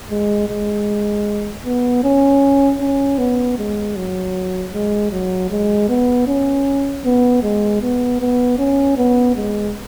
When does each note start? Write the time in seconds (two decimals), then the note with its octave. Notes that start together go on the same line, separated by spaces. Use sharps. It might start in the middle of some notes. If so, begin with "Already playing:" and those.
0.11 G#3
0.48 G#3
1.65 B3
2.04 C#4
2.81 C#4
3.18 B3
3.58 G#3
3.96 F#3
4.73 G#3
5.12 F#3
5.50 G#3
5.89 B3
6.27 C#4
7.05 B3
7.43 G#3
7.82 B3
8.20 B3
8.59 C#4
8.97 B3
9.36 G#3